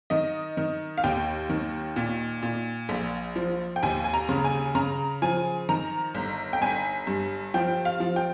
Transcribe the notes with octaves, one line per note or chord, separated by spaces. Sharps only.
D#3 D#5
D#3
F5
D#2 G5
D#3
A#2
A#2
A#1
F3
G5
D#2 G#5
G#5
A#5
C#3
G#5
C#3 A#5
F3 G#5
D#3 A#5
G1
G5
G1 G#5
G2
F3 G5
F5
F3
G5